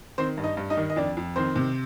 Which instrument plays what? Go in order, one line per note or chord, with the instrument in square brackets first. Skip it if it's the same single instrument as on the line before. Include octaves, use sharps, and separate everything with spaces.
[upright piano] D#3 C4 C5
G2
D#4 D#5
G2
D#4 D#5
D#3
D#5
F2 D4 D5
F2
D#3 C4 C5
C3